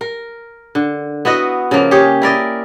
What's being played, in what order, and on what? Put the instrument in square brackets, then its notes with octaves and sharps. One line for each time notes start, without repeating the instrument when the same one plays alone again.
[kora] A#4
D3
B3 E4 F#4 D#5
C#3 F3 A#3
G4 G#4 C#5
E4 A#4 D5 D#5